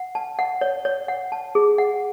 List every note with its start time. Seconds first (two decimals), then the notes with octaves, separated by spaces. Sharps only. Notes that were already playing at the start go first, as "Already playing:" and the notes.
Already playing: F#5
0.15 A5
0.39 F#5
0.61 C#5
0.85 C#5
1.08 F#5
1.32 A5
1.55 G#4
1.78 F#5